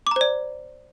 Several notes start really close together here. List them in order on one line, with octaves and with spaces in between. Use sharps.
D6 A#5 C5 D5